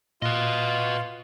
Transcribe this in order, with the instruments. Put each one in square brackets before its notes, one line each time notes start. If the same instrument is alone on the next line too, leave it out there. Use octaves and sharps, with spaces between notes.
[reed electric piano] A#2 [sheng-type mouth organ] F4 [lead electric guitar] B4 D#5